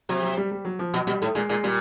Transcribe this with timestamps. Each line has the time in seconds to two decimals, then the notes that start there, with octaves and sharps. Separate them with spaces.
0.09 C3 F#3
0.23 F#3
0.37 G3
0.51 G3
0.65 F#3
0.79 F3
0.94 B2 F#3
1.07 B2 G3
1.21 A2 A3
1.35 A#2 G#3
1.49 A#2 G#3
1.64 A#2 G3